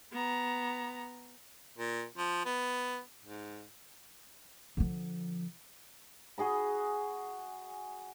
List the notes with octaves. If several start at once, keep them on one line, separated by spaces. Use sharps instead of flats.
B3 A#5
A#2
F3
B3
G#2
D3 F3
F#4 G#4 D#5 B5